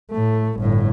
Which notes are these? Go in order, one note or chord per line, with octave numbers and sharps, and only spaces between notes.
A2 A3
G1 A2